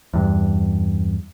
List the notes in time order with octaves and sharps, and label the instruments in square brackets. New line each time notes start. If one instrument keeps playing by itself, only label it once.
[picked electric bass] E2 G2